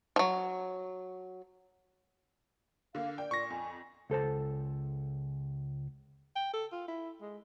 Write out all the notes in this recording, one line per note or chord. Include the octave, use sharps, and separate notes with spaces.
F3 F#3
D3 A#3 F5
D5 G5
A#2 C#6 A#6
F2 G#5
C#2 A4 C5 A5
G5
A4
F4
E4
G#3